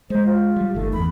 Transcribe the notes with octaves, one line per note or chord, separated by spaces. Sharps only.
G#3 C5
F4
G3
G1 D#3 A3
E2 B5